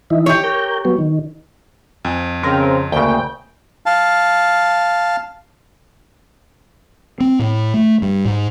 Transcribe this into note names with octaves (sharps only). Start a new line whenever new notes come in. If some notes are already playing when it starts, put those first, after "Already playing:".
E3 D#4 E4
G4 C#5
A#4 G5
F#3 B3
D#3
F2 G5 G#5
C#3 C4 A#4
D2 C#3 A#3 G5
F5 A5
C4
A2
A3
G2
G#2